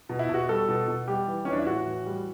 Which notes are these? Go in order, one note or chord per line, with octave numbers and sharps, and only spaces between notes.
B2
E4
B2 F#4
G3 A4
B2
B2
G3 G4
E3
E3 C#4
D4
E4
A2 F#4
E3
G3